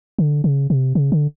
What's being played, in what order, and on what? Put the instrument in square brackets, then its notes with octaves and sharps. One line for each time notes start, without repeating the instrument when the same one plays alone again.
[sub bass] D3
C#3
C3
C#3
D3